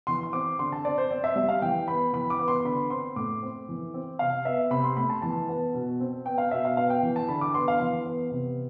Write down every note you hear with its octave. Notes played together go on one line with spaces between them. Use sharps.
E3 C6
C6
C4 D6
D3 C6
A5
C4 D5
C5
C4 D5
E5
G3 E5
F5
E3 G5
B3 B5
E3 B5
D6
B3
C6
D3 B5
C4 C6
A2 D6
C4
E3
C4
C3 F5
B3 E5
C3 B5
C6
A3 B5
A5
E3 A5
B3
B2
C4
B3 G5
F5
B2 E5
F5
B3 F5
G5
E3
A5
D3 B5
D6
B3 C6
F5
E3
B3
C3